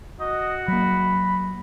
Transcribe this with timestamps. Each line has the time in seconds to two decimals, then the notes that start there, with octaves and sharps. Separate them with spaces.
0.20 F#4 D#5
0.68 F#3 A#3 B5